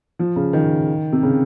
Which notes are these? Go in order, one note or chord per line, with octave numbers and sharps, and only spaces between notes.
F3
C#3
D#3
C3
C#3